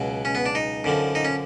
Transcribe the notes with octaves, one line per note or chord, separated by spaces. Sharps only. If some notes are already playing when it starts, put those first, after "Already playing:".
Already playing: C#2 B2 F#3
C#4
B3
D4
D#4
F#2 D3 F3
D#4
C#4